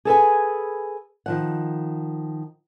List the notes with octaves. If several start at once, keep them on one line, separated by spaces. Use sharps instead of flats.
G#4 A4 B4 G#5
D#3 F3 F#5